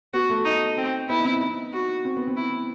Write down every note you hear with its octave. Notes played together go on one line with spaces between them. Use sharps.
B3 F#4
A3
D#4
C4
B3 E4
D#4
C4
D#4
F#4
C4
B3
C4
E4